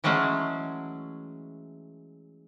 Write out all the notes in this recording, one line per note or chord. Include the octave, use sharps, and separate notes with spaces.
E3 F#3 G#3 A3 C#4